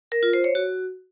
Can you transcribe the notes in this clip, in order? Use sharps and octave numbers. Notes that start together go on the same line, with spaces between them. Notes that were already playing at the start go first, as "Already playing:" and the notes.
A#4
F4
C5
C#5
F#4